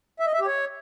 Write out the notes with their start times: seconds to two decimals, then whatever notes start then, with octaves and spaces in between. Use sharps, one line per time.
0.20 E5
0.27 D#5
0.33 E5
0.40 G4
0.47 C#5